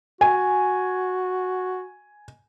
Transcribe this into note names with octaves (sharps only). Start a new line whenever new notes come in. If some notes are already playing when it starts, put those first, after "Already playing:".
F#4 G#5